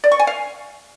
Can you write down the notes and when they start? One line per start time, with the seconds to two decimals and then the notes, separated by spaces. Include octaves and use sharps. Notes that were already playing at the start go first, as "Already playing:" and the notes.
0.04 D5
0.12 C#6
0.19 G#5
0.27 F5